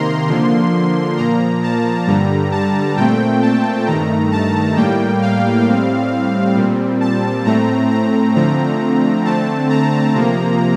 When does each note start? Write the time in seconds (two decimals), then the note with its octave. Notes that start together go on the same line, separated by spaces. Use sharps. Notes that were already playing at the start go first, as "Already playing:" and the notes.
Already playing: C3 D#3 A#3 A#5 C6
0.28 D3 F3 A#3
1.17 A#2 F3 A#3 A#5
1.63 A5
2.07 G2 D3 G3 A#5
2.52 A5
2.97 A#2 A3 C4 G5
3.42 A5
3.86 G2 D#3 A3 A#5
4.31 A5
4.76 A2 G3 A#3 G5
5.22 F5
5.67 A2 G3 C4
6.56 A#2 G3 C4
7.01 A5
7.45 A2 A3 C4 A#5
7.91 A#5
8.35 D3 F3 A3 C4 A#5
9.25 D3 A3 C4 A5
9.70 A#5
10.15 C3 F3 A#3